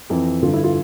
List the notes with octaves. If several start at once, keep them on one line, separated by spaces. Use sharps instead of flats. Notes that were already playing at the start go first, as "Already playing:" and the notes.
F2 E3
G2 D3 F4
E4
F4